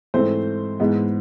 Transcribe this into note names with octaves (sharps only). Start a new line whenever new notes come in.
G#2 E3 A3 C4 C5
G#2 E3 G#3 B3